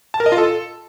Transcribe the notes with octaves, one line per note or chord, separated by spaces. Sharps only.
A5
A#4
D#5
F4
A4